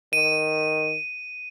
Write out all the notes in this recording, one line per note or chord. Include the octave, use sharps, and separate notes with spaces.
D#3 D#7